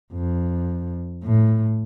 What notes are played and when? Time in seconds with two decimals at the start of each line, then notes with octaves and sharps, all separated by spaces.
0.14 F2
1.24 A2